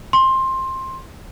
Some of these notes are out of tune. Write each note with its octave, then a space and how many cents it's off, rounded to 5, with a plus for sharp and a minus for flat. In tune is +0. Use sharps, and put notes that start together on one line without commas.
C6 +15